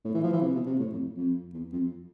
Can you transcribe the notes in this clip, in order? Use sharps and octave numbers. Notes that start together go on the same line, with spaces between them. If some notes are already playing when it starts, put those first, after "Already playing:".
A2
E3
F3
E3
C3
B2
C3
A2
F2
F2
E2
F2